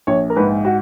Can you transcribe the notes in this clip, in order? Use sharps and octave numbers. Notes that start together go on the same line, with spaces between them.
A#1 C#5
A#4
G#2 B4
F#4